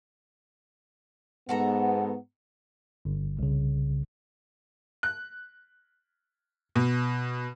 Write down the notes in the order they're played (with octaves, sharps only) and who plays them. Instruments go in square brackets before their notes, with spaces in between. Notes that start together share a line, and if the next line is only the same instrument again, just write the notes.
[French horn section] G#2 B3 [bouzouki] F#4 A4 A#5
[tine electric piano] G1
C2 C#3
[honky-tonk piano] F#6
B2